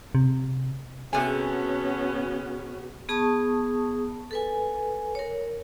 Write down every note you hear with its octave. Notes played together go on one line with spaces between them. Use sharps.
C3
C3 B3 C#4 F#4 G#4 A4 G#5
B3 G#4 A5 C#6 D#6
A4 B4 G#5
A#4 C#5